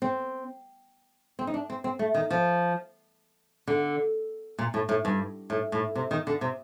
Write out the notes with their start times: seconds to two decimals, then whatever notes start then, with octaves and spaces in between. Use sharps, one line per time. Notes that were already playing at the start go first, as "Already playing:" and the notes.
0.02 C4
1.39 C4
1.47 D#4
1.54 D4
1.70 C4
1.84 C4
1.99 A3
2.15 D#3
2.31 F3
3.67 D3
4.58 A#2
4.74 A2
4.89 A2
5.05 G2
5.50 A2
5.72 A2
5.95 C3
6.11 D#3
6.27 D3
6.41 C3